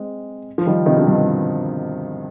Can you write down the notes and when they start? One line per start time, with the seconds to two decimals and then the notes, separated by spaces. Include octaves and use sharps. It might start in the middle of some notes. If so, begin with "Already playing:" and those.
Already playing: G#3 C4
0.58 F3
0.67 D#3 G3
0.86 C3 D#3
0.96 B2 D3
1.06 G2 B2